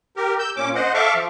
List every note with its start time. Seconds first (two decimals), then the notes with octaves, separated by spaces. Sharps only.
0.17 G4 A#4
0.39 E6 G6
0.57 A#2 C#4 D6
0.75 C5 D#5 F#5
0.94 A4 E5 F5 C#6 D6
1.15 F3